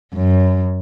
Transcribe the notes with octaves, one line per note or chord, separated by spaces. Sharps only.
F#2